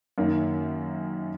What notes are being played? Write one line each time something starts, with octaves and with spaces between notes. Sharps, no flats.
F#2 D#3 A#3